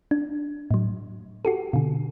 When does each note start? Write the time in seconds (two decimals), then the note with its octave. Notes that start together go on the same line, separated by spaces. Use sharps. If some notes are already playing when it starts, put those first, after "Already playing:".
0.11 D4
0.71 A2 F#3
1.45 F#4 G4 A4
1.73 B2 D3